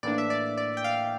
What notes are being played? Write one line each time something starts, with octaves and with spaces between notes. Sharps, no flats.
A2 E3 A#3 D4 D5
E5
D5
D5
G5
F5